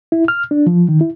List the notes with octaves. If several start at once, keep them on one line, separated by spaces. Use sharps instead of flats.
E4
F6
D4
F3
D#3
E4